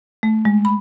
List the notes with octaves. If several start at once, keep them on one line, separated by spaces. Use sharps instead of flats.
A3
G#3
B5